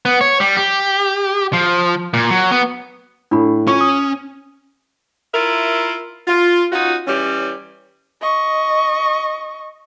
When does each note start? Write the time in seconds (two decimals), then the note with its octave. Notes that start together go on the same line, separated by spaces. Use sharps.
0.05 B3
0.21 C#5
0.40 G3
0.57 G4
1.53 F3
2.14 A#2
2.30 F#3
2.51 B3
3.31 A2 D4 B5
3.67 C#4 F4 C#6
3.81 D#6
5.34 E4 F4 A#4 E5
6.28 F4
6.72 C#4 D#4 F4 F#4
7.07 E3 G3 C#4
8.21 D#5 C#6